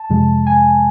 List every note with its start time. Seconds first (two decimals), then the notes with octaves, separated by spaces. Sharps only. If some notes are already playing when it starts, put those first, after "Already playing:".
Already playing: A5
0.10 F2 C3 F3 G#3
0.47 G#5